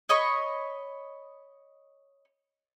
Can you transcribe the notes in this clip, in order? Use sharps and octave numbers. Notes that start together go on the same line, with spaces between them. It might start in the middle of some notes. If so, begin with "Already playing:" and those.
C#5 D#5 B5 C#6